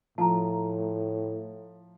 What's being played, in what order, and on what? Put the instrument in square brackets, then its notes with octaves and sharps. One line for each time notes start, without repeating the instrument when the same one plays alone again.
[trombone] A2 [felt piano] F3 [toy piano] A5 A#5